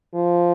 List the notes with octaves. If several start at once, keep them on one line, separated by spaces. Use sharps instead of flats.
F3